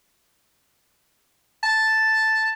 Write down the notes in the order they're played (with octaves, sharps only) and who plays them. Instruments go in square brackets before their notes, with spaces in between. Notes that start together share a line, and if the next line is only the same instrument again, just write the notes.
[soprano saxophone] A5